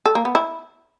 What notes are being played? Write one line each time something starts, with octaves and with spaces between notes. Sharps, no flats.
A4
A#3
B3
E4